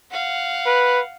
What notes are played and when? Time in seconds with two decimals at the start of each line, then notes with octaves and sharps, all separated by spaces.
0.11 F5 F#5
0.66 B4